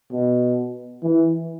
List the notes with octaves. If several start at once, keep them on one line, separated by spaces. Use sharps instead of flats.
B2
E3